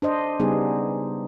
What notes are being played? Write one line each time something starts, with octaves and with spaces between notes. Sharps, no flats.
D4 C5 D#5
C#3 G3 B3 D#4 G#4